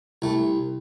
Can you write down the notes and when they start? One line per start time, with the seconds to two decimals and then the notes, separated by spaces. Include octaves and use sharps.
0.22 C2 A3